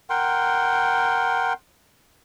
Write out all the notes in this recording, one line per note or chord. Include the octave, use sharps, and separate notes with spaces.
A#4 F#5 G5 C6